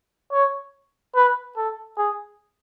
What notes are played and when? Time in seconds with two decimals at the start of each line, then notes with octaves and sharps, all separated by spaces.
0.32 C#5
1.15 B4
1.57 A4
1.98 G#4